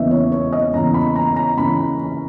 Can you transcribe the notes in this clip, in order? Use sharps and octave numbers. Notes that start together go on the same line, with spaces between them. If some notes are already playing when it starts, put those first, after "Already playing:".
Already playing: E2 C#3 E3 D#5 E5
C#5
C#5
D#5
E2 C#3 E3 A#5
B5
A#5
A#5
C#3 E3 B5